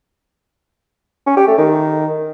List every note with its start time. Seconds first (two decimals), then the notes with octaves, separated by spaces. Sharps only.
1.26 C#4
1.37 G4
1.48 A3
1.58 D#3